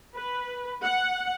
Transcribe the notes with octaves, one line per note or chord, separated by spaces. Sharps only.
B4
F#5